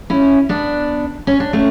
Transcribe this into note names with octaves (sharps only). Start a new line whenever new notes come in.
C#4 E4
B3 D4
C#4
D4
A3 C#4